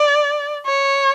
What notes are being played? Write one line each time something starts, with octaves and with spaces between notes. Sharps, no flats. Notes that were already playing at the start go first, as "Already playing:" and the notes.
Already playing: D5
C#5